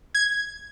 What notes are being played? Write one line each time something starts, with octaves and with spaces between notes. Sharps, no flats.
G#6